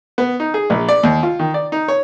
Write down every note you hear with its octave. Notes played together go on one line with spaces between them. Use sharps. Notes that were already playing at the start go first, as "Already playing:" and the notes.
B3
D#4
G#4
A#1
D5
D#2
F4
D#3
D5
D#4
C#5